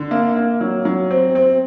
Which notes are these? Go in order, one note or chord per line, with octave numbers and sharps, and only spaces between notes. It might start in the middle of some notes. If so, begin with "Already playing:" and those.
Already playing: D3
A#3
A#3
F#3
F#3
C4
C4